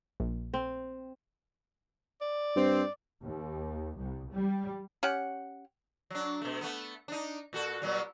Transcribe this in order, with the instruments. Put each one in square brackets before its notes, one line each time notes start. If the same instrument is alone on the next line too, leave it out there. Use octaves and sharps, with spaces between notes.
[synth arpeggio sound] A#1
[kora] C4
[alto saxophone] D5
[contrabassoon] G2 [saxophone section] C4
[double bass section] D#2
C2
G3
[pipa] C#4 G4 F#5
[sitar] F#3 D4
B2 A3
A3 B3
D4 D#4
A#2 F#4 A4
A#2 F#3 G3